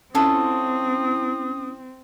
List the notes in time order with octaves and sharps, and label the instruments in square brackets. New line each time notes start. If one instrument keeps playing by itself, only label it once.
[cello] C4 [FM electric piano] C#4 E4 [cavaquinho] F4 A4 C#5 [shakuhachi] D#6